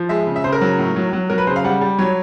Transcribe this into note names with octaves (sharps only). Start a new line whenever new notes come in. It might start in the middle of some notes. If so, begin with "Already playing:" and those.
Already playing: F3
G#3 E5
C#3
E5
C#3 C5
A#4
F#3
A2
F#3
F#3
F#3 A#4
B4
C#3 C5
F5
G3 F#5
G3
F#3 C#5